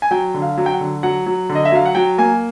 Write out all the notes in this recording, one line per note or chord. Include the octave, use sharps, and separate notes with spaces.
G#5
F#3 G5
D3
F5
F#3
G5
F#5
D3
F#3 F#5
F#3
D3
D#5
E5
F#3 F5
F#5
F#3 G5
A#3 G#5